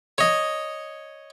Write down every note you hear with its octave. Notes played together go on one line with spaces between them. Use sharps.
C#5 D#5